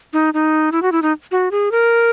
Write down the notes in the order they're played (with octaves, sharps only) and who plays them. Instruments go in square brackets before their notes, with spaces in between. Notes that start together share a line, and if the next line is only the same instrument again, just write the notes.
[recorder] D#4
D#4
E4
F#4
E4
D#4
F#4
G#4
A#4